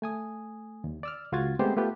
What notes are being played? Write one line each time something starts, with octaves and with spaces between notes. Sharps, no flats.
A3 G#5 D#6
D#2
D5 E6 F6
C#2 F4 F#4 G#6 A6
G#3 A3 B3 C4 G4 C5
A3 B3 F4 G4 B4